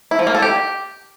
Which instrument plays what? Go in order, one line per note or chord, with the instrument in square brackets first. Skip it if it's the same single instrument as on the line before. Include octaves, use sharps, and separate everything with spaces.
[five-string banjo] E4
F3
A#3
A4
G4